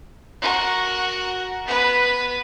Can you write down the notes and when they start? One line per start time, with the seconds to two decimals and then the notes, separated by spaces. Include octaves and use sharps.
0.41 F#4 A#4
1.66 B3 B4